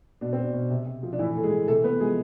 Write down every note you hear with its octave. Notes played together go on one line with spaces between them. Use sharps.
B2 D4
B2 C4
D4
B2
C3
C3
F3
D4
A2 E3 E4
A2 A4
G#3 G#4
E3
C3 A3 A4
C3 B3 B4
F3 G#3 G#4